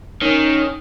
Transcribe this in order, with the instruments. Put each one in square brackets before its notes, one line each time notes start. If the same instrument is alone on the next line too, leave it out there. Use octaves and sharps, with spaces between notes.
[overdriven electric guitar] D#3 [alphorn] C#4